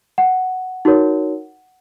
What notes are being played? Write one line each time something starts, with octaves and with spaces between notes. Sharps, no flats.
F#5
D#4 F#4 A#4 C#5